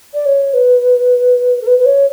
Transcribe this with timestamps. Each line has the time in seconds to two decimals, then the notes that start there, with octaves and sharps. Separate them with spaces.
0.13 D5
0.25 C#5
0.53 B4
1.61 A4
1.66 B4
1.78 B4
1.85 C#5